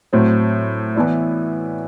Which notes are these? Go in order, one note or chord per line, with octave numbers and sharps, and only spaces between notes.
A2 F#3 C4
E3 B3 E4 B4 D5